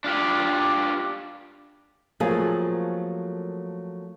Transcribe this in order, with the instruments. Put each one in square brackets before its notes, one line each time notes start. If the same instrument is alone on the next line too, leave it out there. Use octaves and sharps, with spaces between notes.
[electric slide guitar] D4 F4 G4
[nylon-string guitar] F3 F#3 A3 A#3 C4 G#4